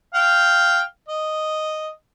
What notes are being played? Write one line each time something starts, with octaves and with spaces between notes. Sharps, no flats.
F5 G5
D#5